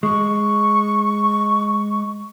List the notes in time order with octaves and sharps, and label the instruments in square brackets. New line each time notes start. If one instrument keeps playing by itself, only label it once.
[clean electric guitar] G#3 [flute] C#6